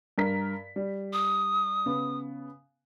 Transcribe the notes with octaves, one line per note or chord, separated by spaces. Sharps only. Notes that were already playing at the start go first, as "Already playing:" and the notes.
G2 A#4 B6
G3
D#6
C#3 B3